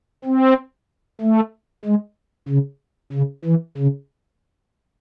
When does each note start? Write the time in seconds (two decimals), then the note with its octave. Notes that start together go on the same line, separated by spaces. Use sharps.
0.25 C4
1.21 A3
1.85 G#3
2.49 C#3
3.13 C#3
3.45 E3
3.77 C#3